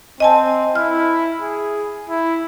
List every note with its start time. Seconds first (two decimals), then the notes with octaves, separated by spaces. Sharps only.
0.20 C4 D#5 G#5 A5
0.75 E4 F6
1.41 G#4
2.09 E4